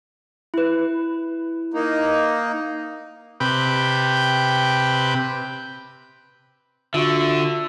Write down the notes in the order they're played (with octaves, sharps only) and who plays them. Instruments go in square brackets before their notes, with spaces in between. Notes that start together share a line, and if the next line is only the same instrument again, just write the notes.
[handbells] E4 B4
[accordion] A#3 D#4
[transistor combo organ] C3 B4 G5
[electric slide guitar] D3 [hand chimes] F4 F#4 C#6 [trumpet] E5